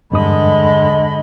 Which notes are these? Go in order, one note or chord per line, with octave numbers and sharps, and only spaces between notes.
E2 G2 D3 G#3 D#5 B5 D#6